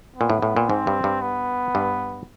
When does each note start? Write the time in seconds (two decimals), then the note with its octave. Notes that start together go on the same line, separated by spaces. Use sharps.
0.17 A#2 B3
0.30 A2
0.42 A2
0.56 A#2
0.69 G#2 C4
0.87 G2
1.04 G2
1.22 B3
1.75 G2